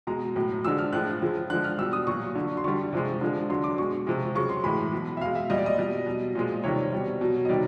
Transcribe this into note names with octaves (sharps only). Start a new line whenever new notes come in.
B2 G#3 A#5
A2 F#3
D3 F3 G#3 E6
F6
A2 F3 G#3 F#6
C#3 F3 G#3
D3 F3 G#3 F#6
F6
B2 G3 E6
D#6
A#2 F#3 C#6
D3 F#3
C6
D3 G3 C#6
C3 F3 G#3
D3 F3 G#3
D3 F#3 C6
D6
B2 G#3 C#6
C3 F3 G#3
C#3 F#3 C#6
C6
A2 E3 G#3 B5
B2 F#3
E5
B2 G#3 F5
E5
A#2 G3 D#5
D5
D#5
B2 G3
B2 F#3
A#2 F3 G#3
C3 D#3 G3 C#5
B2 G3
B2 F#3
D#5
C3 D#3 G3 D5